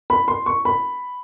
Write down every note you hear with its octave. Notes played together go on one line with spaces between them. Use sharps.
B5
C6
C#6
B5